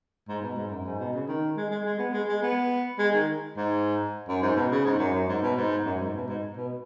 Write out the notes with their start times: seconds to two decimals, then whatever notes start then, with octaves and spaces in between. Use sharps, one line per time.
0.28 G#2
0.42 B2
0.56 G#2
0.71 F#2
0.85 G#2
0.99 B2
1.13 C#3
1.28 D#3
1.56 G#3
1.70 G#3
1.85 G#3
1.99 B3
2.13 G#3
2.28 G#3
2.42 B3
2.99 G#3
3.14 D#3
3.57 G#2
4.28 F#2
4.42 G#2
4.56 B2
4.71 C#3
4.85 G#2
4.99 F#2
5.14 F#2
5.28 G#2
5.42 B2
5.57 G#2
5.85 F#2
6.00 G#2
6.14 B2
6.27 G#2
6.57 B2